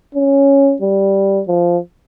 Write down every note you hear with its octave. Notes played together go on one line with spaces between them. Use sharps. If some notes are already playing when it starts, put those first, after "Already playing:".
C#4
G3
F3